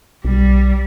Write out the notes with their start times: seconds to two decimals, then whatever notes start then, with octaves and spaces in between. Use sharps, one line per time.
0.25 B1 G3